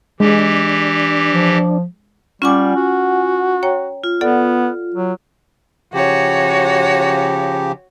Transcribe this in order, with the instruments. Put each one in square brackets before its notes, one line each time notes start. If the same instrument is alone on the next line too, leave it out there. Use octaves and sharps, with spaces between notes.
[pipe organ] E3 G4 [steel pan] G#3 [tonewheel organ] D4
[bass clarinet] F3
[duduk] G3 [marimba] C#4 C#6 D6 [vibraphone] F4 F#5 G#5
[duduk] F#4
[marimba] C#5 G5 A#5
[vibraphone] F4
[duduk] B3 [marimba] A4 D5 F#5
[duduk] F#3
[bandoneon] C#3 F3 G4 [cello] F#4 C#5